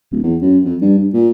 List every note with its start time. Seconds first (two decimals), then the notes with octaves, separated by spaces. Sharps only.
0.11 D1
0.23 E2
0.41 F#2
0.65 F2
0.81 G2
0.98 G2
1.13 A#2